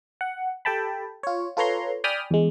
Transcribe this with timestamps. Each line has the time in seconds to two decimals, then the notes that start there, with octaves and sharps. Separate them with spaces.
0.21 F#5
0.65 G4 A4 G5 A5 B5
1.23 F4 C#5
1.57 F4 A4 B4 C#5 A#5 C6
2.04 D5 G5 G#5 B5 D#6 F6
2.31 E2 G#3